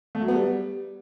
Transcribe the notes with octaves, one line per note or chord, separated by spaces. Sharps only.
A3
F#3
B3
G3